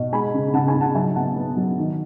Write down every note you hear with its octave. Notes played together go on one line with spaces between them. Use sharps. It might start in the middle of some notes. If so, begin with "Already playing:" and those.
Already playing: B2
G#3 G#5 B5
C#3
C#3 F#5 A5
G#5 B5
C#3
F#5 A5
F#3 E5 G#5
B3 F#5 A5
B3
F#3
D#3